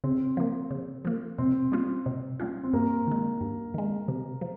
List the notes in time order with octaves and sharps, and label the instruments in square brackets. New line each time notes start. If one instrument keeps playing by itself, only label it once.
[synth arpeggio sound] C#3 [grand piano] C4
[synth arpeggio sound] F3 A#3
C#3
F3 A#3
[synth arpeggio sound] C3 [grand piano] C4
[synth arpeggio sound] G3 A#3 C#4 F4
C3
G3 A#3 C#4 F4
[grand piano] C4
[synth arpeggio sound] G2 [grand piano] A#3
[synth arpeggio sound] D#3 G#3
G2
D#3 G#3
C3
F3